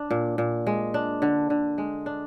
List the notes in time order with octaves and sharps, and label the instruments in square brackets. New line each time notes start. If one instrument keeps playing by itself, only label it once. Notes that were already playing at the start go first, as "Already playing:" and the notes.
Already playing: [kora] D4
A#2
A#2
G#3
D4
D3
D3
G#3
D4